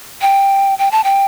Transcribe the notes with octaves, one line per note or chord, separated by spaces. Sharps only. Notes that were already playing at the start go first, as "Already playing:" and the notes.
G5
G5
A5
G5